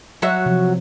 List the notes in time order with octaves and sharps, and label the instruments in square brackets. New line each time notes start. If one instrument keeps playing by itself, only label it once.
[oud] F#3 F#4 E5
[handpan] C3 F3